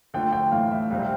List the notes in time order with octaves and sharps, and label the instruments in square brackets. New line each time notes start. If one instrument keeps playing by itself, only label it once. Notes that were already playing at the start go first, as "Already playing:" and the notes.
[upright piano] D3 F3 A3 [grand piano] G5
[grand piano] G5
[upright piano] A2 E3 A3 [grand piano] F5
[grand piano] E5
[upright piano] C2 C3 G3 C4 [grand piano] F5
[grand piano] G5